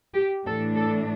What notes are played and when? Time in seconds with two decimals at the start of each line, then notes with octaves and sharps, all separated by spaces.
0.14 G4
0.45 A2 E3 A3 D4 A4
0.76 A4